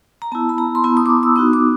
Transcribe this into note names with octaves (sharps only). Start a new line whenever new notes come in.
A#5
B3 E4 A5
B5
A#5
C6
B3 E4 B5
D#6
D6
D#6
E6
B3 D#4 F#4 D#6
D6